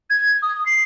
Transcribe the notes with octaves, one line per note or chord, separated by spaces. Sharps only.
G#6
D#6
C7